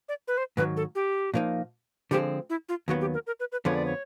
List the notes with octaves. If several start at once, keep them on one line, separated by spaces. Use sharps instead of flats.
D5
B4
C5
G#2 D#3 F#3 B4
A4
G4
A#2 F3 A#3 D#4
D3 F3 G#3 C4 G4
E4
F4
D#2 D#3 F#3 B3 F#4
G4
A#4
A#4
B4
B4
F2 D3 F3 G#3 B3 C#5
D5
C#5